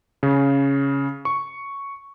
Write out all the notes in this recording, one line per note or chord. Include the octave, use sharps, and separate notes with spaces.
C#3
C#6